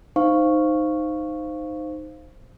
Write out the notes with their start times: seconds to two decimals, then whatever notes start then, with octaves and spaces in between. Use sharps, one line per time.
0.16 D#4 C5 F5 C#6